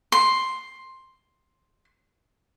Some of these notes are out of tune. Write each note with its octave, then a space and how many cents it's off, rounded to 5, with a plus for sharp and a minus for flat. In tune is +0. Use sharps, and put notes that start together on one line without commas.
C6 +5